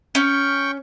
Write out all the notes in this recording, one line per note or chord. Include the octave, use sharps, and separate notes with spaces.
C#4 G5 C#6